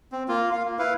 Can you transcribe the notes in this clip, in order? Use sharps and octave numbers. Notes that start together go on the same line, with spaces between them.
C4
A#3 F4
F4 F5
A#3
E4 B4 F5